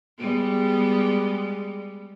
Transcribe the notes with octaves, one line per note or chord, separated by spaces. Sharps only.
G3 G#3 B3